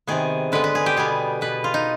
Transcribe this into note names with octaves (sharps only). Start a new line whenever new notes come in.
C3 D#3 B3 G#4
D3 G#3 B3 B4
B4
G#4
G4
B2 G3 B3 G#4
B2 B3 B4
F4
D#4